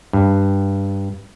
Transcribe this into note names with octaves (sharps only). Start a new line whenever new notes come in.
G2